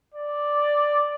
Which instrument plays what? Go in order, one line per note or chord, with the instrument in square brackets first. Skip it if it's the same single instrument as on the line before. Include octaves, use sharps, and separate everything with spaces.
[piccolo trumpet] D5